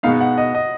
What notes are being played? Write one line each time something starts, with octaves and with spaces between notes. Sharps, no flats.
B2 G#3 B3 D#4 F5
F#5
D#5
D#5